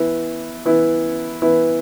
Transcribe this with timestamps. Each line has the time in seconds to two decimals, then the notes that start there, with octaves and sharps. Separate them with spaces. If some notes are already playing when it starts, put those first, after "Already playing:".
Already playing: E3 B3 E4
0.65 E3 B3 E4
1.42 E3 B3 E4